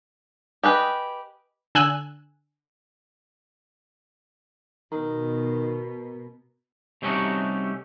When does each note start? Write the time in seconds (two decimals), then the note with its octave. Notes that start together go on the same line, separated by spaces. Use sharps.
0.63 G4 G#4 B4 D#5
1.75 D3 G#5 E6 F#6
4.92 B2 D#3 A#4 A#5
7.02 C3 G3 A3 C#4 D#4 F#4